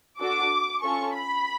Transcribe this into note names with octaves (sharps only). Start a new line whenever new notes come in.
D4 F#4 A4 D6
C#4 F4 A4 C#6
B5